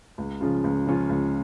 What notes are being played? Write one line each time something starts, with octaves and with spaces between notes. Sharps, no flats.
C#2
C#3 F3 C#4 F4
C#2
C#3 F3 C#4 F4
C#2